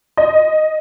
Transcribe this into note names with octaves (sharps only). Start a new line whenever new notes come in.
D#5